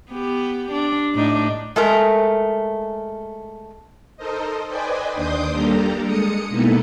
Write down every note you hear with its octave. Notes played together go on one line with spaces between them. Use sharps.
B3 G4
D4
A2 D4 D#4
G#3 A3 A#4
D#4 A4 A#4 C5 D#5
B4 C5 D5 D#5 G5 G#5
D#2 D4 C6 D6 D#6 G6
G3 A#3 D4 G4 A4 A#5
G#3 D#6 C#7
B2 A#3 B3 D#4 E4 A4